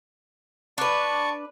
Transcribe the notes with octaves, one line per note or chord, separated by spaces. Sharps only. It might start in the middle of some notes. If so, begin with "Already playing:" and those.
D4 B4 D5 A5 C#6